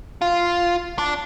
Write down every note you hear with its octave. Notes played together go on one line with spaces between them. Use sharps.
F4
D4